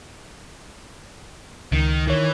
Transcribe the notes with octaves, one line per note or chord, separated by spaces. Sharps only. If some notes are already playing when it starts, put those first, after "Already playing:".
C#2 D#3
D#3 E3 C#5